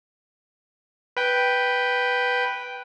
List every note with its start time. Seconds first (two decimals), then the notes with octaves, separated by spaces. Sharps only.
1.17 B4 G5